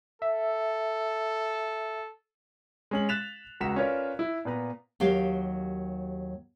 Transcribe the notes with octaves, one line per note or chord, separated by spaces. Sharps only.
A4 E5
G#3 C#4 F#7
F#6 A6 B6 E7 F7
C#2 F#4 A#5 C#6 B6 E7
C#4 F4 A#4 B4 C#5 D5
E4
A#2 B3 B4 A#5
D#2 F#3 G4 F5